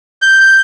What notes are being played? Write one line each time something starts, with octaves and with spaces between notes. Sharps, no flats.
G6